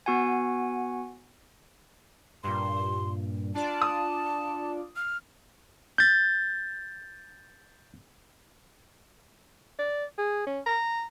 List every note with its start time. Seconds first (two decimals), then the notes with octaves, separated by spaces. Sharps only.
0.06 B3 F#4 F#5 G#5
2.44 G2 A#2 C6
3.55 D4 F4 D5 A5
3.82 D#6
4.96 F6
5.98 G6 A6
9.79 D5
10.18 G#4
10.47 C#4
10.66 A#5